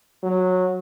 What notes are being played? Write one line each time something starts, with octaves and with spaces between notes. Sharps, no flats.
F#3